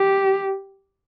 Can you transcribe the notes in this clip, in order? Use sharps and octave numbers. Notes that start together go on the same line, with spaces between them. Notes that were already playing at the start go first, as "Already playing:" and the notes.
Already playing: G4